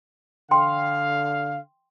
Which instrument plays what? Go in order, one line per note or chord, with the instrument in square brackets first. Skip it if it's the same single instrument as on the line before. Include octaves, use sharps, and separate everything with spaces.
[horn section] D3 F5 [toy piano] G5 C6